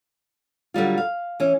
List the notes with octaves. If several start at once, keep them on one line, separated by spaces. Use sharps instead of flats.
D3 F#3 G3 F4
F5
E3 C#4